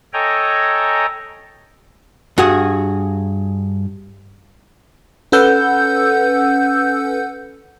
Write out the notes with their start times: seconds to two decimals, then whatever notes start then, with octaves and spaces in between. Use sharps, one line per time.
0.13 A4 C#5 D#5 G5 G#5 A#5
2.38 G2 F#4 G#4
5.32 C#4 A4 B4 F#5 E6 G6